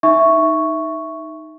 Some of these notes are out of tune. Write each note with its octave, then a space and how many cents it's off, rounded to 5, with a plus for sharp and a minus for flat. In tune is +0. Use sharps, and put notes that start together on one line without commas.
D#4 +0 E5 +0 C#6 +0